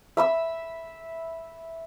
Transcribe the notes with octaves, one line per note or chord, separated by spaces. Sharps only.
E5 B5 E6